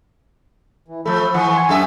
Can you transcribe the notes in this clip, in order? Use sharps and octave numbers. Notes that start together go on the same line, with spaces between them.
E3
F3 A3 A4 B5
E3 F#5 C#6 D#6
G#5 C6
F#2 A4 E5